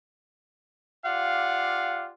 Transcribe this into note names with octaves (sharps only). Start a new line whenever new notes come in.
F4 G4 D5 F5 F#5